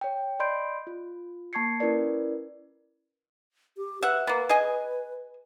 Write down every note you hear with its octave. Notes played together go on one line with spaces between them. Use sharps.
C#5 G5
D5 D#5 B5 C6 G6 D7
F4
A#3 A5 C#6 G#6 C7 C#7
C#4 E4 A#4 B4 D5
G4
B4 E5 F#5
A#3 B3 B4
G#4 D#5 G#5